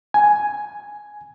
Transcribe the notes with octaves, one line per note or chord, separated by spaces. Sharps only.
G#5